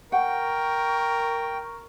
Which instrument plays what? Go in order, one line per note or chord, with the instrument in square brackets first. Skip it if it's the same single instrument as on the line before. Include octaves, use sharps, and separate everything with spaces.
[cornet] A#4 [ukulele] F#5 [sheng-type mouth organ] G5 [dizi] C#6